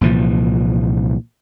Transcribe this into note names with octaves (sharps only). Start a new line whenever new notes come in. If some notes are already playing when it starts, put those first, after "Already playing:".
C2 A#2 E3 F3